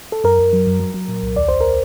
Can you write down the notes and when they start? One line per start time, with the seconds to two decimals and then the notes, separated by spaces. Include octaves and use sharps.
0.12 A4
0.24 F#2 A#4
0.39 F#2
0.53 F#3
0.67 F#2
0.80 F#3
0.94 F#3
1.09 A#2
1.23 C2
1.36 D#2 D5
1.48 D#2 C5
1.61 A#4